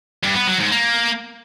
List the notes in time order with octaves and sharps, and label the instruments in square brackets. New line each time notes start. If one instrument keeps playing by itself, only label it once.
[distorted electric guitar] G2
B3
F#3
G#2
A#3